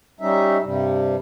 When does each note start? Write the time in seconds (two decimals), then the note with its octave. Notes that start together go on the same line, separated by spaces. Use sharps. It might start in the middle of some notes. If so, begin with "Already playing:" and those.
0.21 G3 C#4 D#4 E5
0.63 G2 C3 G3